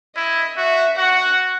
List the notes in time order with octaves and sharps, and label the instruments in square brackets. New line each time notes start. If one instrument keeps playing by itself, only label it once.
[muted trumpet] E4 [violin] D#5
[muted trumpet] F#4 [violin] E5
[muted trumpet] F#4 [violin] F#5